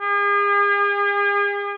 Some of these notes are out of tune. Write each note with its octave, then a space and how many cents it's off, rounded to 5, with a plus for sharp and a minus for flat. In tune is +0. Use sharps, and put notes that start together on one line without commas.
G#4 -45